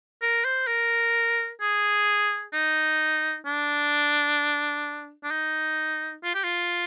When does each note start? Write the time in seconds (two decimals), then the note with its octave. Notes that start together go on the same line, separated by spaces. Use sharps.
0.22 A#4
0.44 C5
0.67 A#4
1.61 G#4
2.53 D#4
3.45 D4
5.23 D4
5.31 D#4
6.23 F4
6.34 G4
6.44 F4